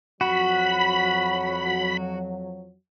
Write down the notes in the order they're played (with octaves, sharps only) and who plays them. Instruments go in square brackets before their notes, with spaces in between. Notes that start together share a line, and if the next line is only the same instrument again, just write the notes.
[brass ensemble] F2 F3 F#3 [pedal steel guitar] F#4 [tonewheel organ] B5